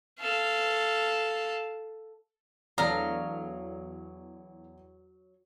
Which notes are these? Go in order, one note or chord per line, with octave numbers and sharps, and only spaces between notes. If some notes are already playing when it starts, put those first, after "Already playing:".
A4 F5
E2 F#3 A3 D4 F5 A#5 D#6